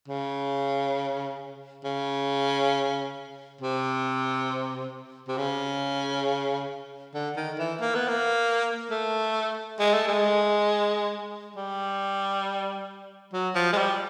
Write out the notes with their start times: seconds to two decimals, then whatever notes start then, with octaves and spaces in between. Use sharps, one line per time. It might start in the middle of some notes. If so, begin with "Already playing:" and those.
0.08 C#3
1.85 C#3
3.61 C3
5.28 C3
5.38 C#3
7.14 D3
7.37 D#3
7.59 E3
7.81 A#3
7.95 B3
8.08 A#3
8.91 A3
9.80 G#3
9.94 A3
10.08 G#3
11.56 G3
13.34 F#3
13.55 F3
13.73 G#3
13.78 G3